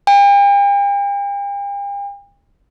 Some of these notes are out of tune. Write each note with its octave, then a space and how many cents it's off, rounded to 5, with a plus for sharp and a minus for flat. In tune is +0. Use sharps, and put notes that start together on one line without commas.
G5 +45